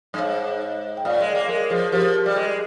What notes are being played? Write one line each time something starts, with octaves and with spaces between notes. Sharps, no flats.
G2
G#2 C#5 F5
G5
A#2 C#5 F5
G#3
A#3
G#3 A#4 C#5
F3 G#4 C5
F3 G4 A#4
G3
G#3